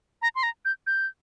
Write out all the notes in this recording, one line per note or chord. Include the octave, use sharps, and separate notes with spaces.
A#5
C6
A#5
G6
G6